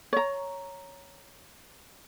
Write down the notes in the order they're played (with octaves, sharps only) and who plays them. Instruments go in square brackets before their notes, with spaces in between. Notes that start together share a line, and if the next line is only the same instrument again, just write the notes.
[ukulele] C#5 A#5